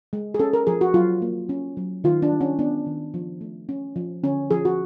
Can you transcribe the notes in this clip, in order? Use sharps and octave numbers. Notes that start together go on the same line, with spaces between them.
G#3
G#4
C#4 A4
A#4
F3 G#4
F#4
F#3 F4
A#3
C#4
F#3
D#3 F4
D4
G3
C#4
B3 D4
D#3
F3
A3
C#4
F3
D3 C#4
F3 G#4
F#4